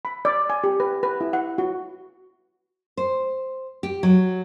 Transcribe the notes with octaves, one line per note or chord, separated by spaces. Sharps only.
B5
D5
G#5
G4
B4
B4
E4
F#5
F#4
C5
G4
F#3